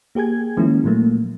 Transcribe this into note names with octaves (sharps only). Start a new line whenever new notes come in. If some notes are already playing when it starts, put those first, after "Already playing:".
A#3 G4 G#4 G#5 G#6
D#3 F3 G#3 A#3 C#4 E4
A#2 F3 F#3 A3 A#3